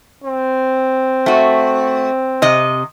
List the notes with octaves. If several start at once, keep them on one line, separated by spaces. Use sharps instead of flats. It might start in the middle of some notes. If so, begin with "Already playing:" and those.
C4
A3 F#4
C3 D#5